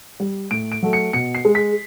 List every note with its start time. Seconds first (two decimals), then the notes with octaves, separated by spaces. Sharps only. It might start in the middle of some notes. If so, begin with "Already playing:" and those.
0.20 G3
0.51 A2 D7
0.72 D7
0.82 F#3 A3
0.93 C#7
1.13 B2 C#7
1.35 C7
1.45 G#3
1.55 B6